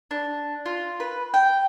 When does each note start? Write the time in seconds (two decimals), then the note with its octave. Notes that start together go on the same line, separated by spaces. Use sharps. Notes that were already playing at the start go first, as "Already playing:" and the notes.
0.11 D4
0.66 F4
1.00 B4
1.34 G5